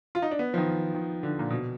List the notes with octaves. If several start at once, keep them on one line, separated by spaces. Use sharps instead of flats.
F4
D#4
D4
B3
F3
D#3
D#3
D3
A#2
B2